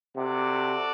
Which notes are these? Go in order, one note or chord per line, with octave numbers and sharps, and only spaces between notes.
C3 F#4 A4 D5 F#5